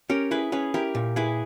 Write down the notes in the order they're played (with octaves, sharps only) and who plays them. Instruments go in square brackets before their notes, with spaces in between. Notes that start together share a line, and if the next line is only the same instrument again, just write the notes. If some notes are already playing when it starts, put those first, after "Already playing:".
[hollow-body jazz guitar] C#4 [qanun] G4 A#4
[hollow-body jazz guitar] E4 [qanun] G#4 B4
[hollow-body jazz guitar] C#4 [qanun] G#4 B4
[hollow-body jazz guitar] E4 [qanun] G4 A#4
[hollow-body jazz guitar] A#2
[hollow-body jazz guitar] E4 [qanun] G#4 B4